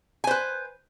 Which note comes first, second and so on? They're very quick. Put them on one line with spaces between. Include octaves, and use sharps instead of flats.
G#5 C5 B4